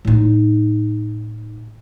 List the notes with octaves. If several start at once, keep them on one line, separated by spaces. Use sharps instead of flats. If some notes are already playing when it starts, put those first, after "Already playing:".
A2 D#4